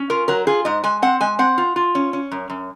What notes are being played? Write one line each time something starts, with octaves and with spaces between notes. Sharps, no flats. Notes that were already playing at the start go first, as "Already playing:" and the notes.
Already playing: C#4
F4 A#4
F#3 A#4
F4 G#4
G#2 D#5
G#3 G#5
C4 F#5
G#3 G#5
C4 F#5
F4
F4
C#4
C#4
F#2
F#2